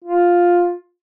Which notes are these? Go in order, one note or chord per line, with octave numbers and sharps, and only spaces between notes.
F4